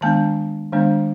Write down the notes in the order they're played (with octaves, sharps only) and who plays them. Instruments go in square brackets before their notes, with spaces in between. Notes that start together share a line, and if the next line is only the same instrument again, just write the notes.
[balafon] D#3 G#3 B3 D4 A5
D#3 G#3 B3 D4